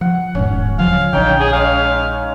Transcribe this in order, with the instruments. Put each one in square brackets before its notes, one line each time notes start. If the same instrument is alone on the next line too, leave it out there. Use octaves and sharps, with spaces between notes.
[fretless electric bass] F3 [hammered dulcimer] F#5
[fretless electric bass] D#1 E2 G#2 [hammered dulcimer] C#4
[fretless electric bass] D3 F3 F#3 [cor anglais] F5
[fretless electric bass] A#1 D3 [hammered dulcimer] C#4 D#4 C#5 [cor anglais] G5
[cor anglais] G#4
[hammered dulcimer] G#3 C#4 [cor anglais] F5